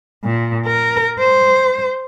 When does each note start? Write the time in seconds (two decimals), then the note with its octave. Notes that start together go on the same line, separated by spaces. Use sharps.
0.24 A#2
0.66 A#4
1.19 C5